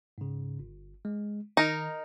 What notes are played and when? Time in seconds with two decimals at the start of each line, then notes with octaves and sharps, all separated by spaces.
0.18 G#2 C#3
0.59 G1
1.05 G#3
1.57 D#3 D#4 A#4